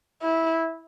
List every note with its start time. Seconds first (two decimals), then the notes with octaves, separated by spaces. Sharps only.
0.22 E4